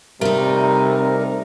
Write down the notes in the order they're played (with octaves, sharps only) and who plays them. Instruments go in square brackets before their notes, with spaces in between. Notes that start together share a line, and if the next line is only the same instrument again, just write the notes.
[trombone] C3 [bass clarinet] G3 [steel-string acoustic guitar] A3 D#4 [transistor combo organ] A#4